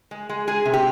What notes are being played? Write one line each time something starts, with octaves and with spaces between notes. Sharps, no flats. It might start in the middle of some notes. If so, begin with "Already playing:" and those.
G#3
G#3
G#3 G#4
C3
G4